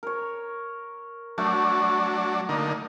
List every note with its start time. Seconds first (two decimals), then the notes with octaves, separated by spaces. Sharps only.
0.03 A#4 C#5
1.38 F#3 A3 D4
2.49 D3 A#3 D#4